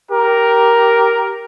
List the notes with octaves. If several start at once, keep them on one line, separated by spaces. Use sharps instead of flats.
G4 A#4